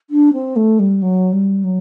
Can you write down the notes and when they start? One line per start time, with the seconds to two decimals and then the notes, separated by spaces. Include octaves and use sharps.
0.10 D4
0.33 C4
0.56 A3
0.79 G3
1.02 F#3
1.33 G3
1.64 F#3